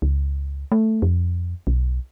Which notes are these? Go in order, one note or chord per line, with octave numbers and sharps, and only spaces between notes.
C#2
A3
F2
B1